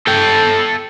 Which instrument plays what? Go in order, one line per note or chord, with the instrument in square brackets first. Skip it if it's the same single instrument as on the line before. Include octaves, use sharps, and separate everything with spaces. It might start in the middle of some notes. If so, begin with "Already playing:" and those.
[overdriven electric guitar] A4 G5